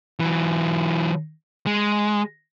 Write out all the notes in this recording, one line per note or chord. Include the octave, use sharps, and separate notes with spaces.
E3 F#3
G#3